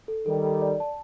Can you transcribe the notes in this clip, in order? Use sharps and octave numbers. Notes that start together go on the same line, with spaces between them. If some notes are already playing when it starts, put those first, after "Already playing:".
A4
D#3 G3 A4
A4
D5
A5